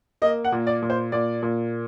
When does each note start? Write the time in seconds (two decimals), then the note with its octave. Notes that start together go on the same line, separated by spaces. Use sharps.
0.22 A#3 D#5
0.45 F#5
0.52 A#2
0.67 D5
0.82 A#2
0.90 C5
1.12 A#2 D5
1.43 A#2